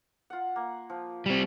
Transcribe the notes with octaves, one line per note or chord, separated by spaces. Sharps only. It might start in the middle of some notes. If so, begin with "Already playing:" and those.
F4 F#5
A#3
F3
G3 C4